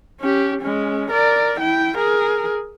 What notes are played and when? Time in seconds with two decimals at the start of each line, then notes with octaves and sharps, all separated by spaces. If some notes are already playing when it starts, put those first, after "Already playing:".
0.20 C#4 G4
0.61 G#3 C#4
1.10 A#4 D5
1.59 E4 G5
1.97 G#4 A#4